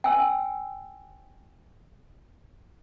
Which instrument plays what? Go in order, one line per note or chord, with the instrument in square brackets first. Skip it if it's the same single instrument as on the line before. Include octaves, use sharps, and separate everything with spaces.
[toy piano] G5 G#5 E6